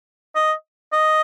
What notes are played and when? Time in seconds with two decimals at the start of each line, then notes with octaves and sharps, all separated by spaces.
0.35 D#5
0.92 D#5